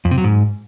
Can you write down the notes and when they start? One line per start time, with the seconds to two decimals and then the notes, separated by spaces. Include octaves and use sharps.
0.05 F2
0.11 C3
0.18 F#3
0.24 G#2